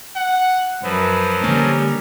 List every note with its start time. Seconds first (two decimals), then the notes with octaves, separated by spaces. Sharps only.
0.16 F#5
0.83 F#2 F3 F#3 B4
1.44 D3 G3 A#3 C#4 A#4